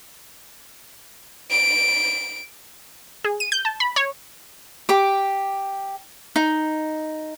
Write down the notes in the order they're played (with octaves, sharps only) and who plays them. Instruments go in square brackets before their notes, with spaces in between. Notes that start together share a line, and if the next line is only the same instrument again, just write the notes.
[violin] D7
[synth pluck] G#4
D#7
G6
A5
B5
C#5
[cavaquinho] G4 D6
D#4